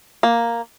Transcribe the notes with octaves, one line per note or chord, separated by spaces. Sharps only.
A#3